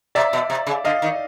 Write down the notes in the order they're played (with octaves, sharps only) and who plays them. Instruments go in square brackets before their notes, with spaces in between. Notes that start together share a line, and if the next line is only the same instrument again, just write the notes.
[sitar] C3 [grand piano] D5 E5
[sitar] B2
C3
C#3
[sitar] D3 [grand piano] D#5 F5
[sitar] D#3